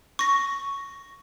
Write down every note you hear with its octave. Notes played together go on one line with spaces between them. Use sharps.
C#6 A#6